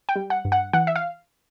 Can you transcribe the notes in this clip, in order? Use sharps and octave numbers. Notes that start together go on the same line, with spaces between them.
G5
G3
F#5
G2
F#5
E3 F#5
E5
F5